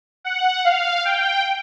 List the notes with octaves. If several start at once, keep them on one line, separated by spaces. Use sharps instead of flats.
F#5
F5
G5